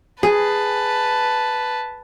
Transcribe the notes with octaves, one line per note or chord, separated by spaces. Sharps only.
G#4 B4 A5